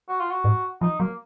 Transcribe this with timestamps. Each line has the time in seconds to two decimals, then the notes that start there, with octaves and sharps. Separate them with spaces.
0.09 F#4
0.20 F4
0.31 F#4
0.44 G#2
0.81 F3 D#4
1.00 F#3 A#3